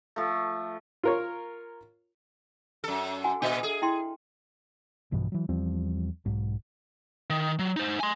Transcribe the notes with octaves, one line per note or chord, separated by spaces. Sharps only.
F3 A3
F4 A#4 C#5
F#2 A4
F#4 F#5 G#5
A#2 D4 D#5 E5
G#4 A4
E4 G5 C6
A#1 G2 B2 E3
E3 F#3
E2 F3 G3 C4
B1 G#2
D#3
F#3
D#4 C5
G#5 C6